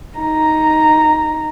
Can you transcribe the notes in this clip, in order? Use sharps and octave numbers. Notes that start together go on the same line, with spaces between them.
D#4 A#5